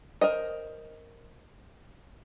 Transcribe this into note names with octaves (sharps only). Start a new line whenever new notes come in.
A#4 C5 D#5